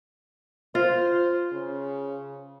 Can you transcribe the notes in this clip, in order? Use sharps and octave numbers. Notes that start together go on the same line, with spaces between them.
F4 C5
C#3